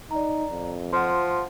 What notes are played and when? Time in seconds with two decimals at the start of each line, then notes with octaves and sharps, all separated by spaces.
0.11 D#4 D5 A#5
0.50 F2
0.93 F3 F#5 C6